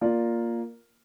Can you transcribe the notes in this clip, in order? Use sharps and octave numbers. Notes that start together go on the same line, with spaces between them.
A#3 F4 A#4 D5